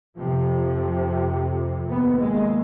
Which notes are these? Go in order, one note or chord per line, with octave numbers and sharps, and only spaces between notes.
F2 C3 F3
D#2 B3
G#3